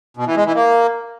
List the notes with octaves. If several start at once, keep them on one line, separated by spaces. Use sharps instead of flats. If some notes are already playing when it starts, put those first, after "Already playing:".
B2
E3
G#3
E3
A#3